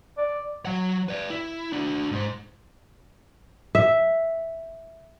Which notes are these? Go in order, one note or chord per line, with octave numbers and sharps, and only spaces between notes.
D5
F#3 F#5
B4 D5
E4
D4 F#4
G#2 C5
E5